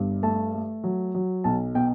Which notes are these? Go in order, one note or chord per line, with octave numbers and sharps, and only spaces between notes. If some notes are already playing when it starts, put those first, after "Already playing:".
Already playing: G1 G2
A3 A5
A3
F#3
F#3
B1 A5
B2 G5